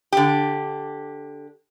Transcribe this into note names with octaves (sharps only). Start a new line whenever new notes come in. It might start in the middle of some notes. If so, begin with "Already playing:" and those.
D3 G4